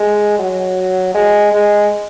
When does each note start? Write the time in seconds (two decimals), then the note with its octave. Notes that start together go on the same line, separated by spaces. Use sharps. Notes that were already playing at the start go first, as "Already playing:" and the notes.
Already playing: G#3
0.39 F#3
1.14 G#3
1.53 G#3